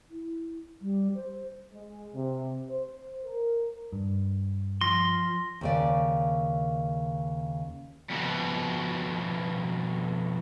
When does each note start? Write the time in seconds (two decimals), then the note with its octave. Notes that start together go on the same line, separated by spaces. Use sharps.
0.10 E4
0.82 G3
1.15 C5
1.72 G#3
2.13 C3
2.70 C5
3.24 A#4
3.92 G2
4.81 F3 C6 A#6
5.61 D#2 C#3 D5
8.10 F2 B2